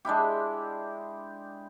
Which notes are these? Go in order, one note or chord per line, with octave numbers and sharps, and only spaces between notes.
G#3 D4 E4 G4